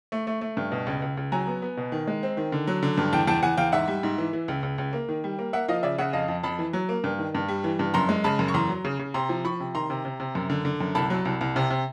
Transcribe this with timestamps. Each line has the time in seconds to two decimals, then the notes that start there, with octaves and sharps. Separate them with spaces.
0.12 A3
0.27 A3
0.41 A3
0.57 G2
0.72 B2
0.87 C#2
1.02 C#2
1.17 C#2
1.32 F#3 G#5 A#5
1.47 B3
1.62 B3
1.77 B2
1.92 D#3
2.08 G#3
2.23 C4
2.37 D#3
2.52 D3
2.67 F#3
2.83 D3
2.97 G2
3.13 E2 G5 A5
3.27 E2 G5 A5
3.43 E2 F#5 G#5
3.57 E2 F5 G5
3.72 G#2 E5 F#5
3.88 G3
4.03 G#2
4.18 E3
4.33 E3
4.48 C#2
4.63 C#2
4.78 C#2
4.93 A#3
5.09 D#3
5.24 G3
5.38 A#3
5.53 A#3 E5 F#5
5.68 F3 D#5 F5
5.83 C#3 D5 E5
5.98 C#3 E5 F#5
6.13 F2 D#5 F5
6.28 F2
6.43 F2 A5 B5
6.59 E3
6.73 F#3
6.89 A#3
7.04 G2
7.19 D#3
7.35 G2
7.48 G3
7.64 E3
7.79 G2
7.94 F#2 A#5 C6
8.09 G#3
8.24 C#3 A5 B5
8.39 F#2
8.48 C#6
8.54 E2 A#5 C6
8.69 F#3
8.85 C#3
8.99 C#3
9.14 C3 A#5 C6
9.29 F3
9.45 F3 B5 C#6
9.60 C3
9.75 D#3 A#5 C6
9.90 C3
10.05 C3
10.20 C3
10.35 F#2
10.50 D3
10.65 D3
10.81 F#2
10.95 C2 A5 B5
11.10 F#3
11.25 C2
11.41 C2
11.56 C3
11.70 C3